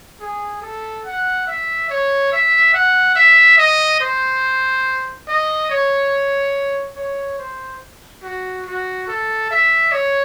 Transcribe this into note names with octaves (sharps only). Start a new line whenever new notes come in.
G#4
A4
F#5
E5
C#5
E5
F#5
E5
D#5
C5
D#5
C#5
C#5
C5
F#4
F#4
A4
E5
C#5